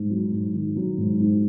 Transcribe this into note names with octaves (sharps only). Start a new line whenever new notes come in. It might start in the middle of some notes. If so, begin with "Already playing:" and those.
Already playing: G#2
F#3
G#2
D#3
F#3
G#2
G#2